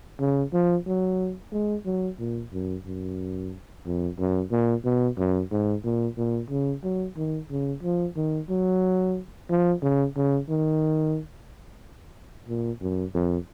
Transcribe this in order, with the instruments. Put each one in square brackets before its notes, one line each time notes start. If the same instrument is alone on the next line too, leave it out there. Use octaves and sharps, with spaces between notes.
[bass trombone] C#3
F3
F#3
G#3
F#3
A#2
F#2
F#2
F2
F#2
A#2
B2
F#2
G#2
A#2
A#2
C#3
F#3
D#3
C#3
F3
D#3
F#3
F3
C#3
C#3
D#3
A#2
F#2
F2